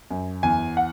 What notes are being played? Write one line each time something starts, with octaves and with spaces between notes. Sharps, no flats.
F#2
E2 G#5
F#5